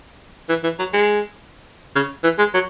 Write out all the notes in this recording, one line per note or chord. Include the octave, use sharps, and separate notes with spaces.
E3
E3
F#3
G#3
C#3
E3
G#3
F#3